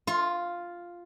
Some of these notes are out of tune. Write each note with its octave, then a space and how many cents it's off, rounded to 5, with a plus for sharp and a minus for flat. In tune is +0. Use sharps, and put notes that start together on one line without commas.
F4 +0 C6 +45